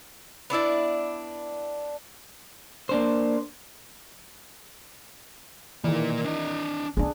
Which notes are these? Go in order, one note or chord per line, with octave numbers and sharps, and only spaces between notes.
B3 D4 E4 D5
A#3 D4 C5
D#3 E3 A#3 D5
D4 D#5
B3 C#4 D4 G#4